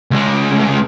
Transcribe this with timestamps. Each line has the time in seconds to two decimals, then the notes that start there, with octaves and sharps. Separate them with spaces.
0.11 C#2 G#3